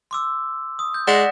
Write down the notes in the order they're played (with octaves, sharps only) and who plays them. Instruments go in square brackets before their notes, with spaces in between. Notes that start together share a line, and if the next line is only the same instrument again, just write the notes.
[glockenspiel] C6 D6 E6
D#6
G6
[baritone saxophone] G#3 [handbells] D5 F#5 [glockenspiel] A#6 B6 E7